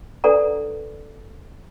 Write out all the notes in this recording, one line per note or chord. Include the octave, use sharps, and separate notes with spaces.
D4 A4 B4 D5 F#5 A#5